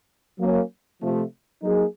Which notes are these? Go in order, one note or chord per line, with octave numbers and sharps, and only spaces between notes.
F#3 A#3 C#4
C3 F3 A3
F#3 A#3 D#4 G#4